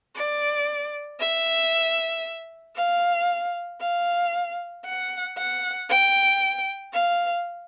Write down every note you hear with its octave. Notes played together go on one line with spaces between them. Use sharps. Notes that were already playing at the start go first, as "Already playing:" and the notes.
D5
E5
F5
F5
F#5
F#5
G5
F5